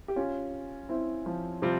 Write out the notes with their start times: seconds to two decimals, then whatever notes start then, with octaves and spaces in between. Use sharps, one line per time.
0.08 G4
0.16 C#4 F4
0.89 C4 E4
1.26 F3
1.62 C3 F3 G3 C4 F4